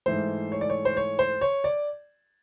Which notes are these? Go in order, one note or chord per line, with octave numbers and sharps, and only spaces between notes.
G#2 E3 A3 C5
C#5
D5
C#5
C5
C#5
C5
C#5
D5